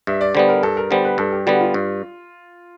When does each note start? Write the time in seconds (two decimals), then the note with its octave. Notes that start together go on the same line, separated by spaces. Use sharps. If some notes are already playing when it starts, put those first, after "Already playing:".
0.07 G2 E5
0.21 D5
0.35 D3 G3 B3 C5
0.49 A#4
0.63 G2 A4
0.77 A#4
0.91 D3 G3 B3 C5
1.05 B4
1.18 G2 A4
1.32 G4
1.46 D3 G3 B3 F#4
1.61 F4
1.74 G2